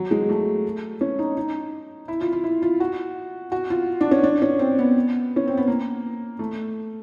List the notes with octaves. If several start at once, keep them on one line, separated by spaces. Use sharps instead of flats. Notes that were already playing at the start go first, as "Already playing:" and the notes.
Already playing: F#3
G#3
A3
C#4
D#4
D#4
E4
F4
F4
E4
F4
F#4
F#4
F4
D4
C#4
D4
C#4
C4
B3
C#4
C4
B3
A#3
A3